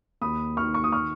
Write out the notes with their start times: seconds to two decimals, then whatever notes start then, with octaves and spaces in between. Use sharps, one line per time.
0.21 D#2 B5 D#6
0.57 D#3 C#6 F6
0.74 C#6
0.84 D#6
0.92 C#6 F6